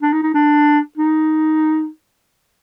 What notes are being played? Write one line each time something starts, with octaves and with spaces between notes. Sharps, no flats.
D4
D#4
D#4
D4
D#4